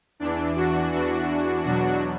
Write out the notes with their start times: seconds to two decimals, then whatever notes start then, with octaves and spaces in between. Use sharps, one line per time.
0.20 E2 E3 D4
0.55 D4 F#4
0.92 E2 E3 D4 F#4
1.64 E2 B2 F#3 D4 F#4